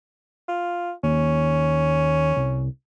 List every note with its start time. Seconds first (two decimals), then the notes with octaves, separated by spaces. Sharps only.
0.48 F4
1.03 D#2 C#4
2.37 C2